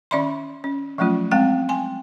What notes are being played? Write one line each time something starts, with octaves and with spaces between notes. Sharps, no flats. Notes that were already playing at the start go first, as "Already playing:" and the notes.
D#3 C#4 D5 E5 B5 C6
C#4
F3 F#3 A3 C#4 F4
G#3 C4 F5 G5
G5 G#5 C6